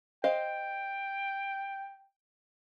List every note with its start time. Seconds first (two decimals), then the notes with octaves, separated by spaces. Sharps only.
0.24 C5 D#5 F5 G5